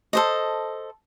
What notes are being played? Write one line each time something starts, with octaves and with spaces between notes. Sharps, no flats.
A4 C5 D#5